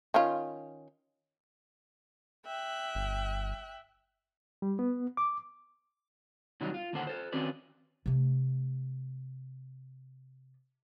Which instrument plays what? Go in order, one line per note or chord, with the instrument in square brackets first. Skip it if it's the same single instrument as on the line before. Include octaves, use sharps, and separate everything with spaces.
[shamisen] D#3 C#4 F4
[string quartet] E5 G5 F#6
[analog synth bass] G1
[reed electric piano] G3
B3
D6
[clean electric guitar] B2 D#3 F#3 G3 D4 D#4
F4
D#2 A#2 D3 A4 C5 F#5
A4 C5
D#3 C4 C#4 F#4 B4 D5
[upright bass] C3 A3